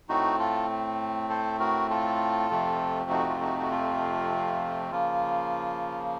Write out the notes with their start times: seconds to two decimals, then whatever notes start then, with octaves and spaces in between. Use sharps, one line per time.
0.09 A2 A3 C4 D#4 F#4
0.39 F4 A4
1.30 A4 C5
1.60 F#4 A#4
1.90 F4 A4
2.50 F2 C3 F3 A3 C4
3.11 D#4 F#4
3.29 F4
3.41 D#4 F#4
3.60 F#4
3.71 F4
4.91 C#3 F3 A#3 F4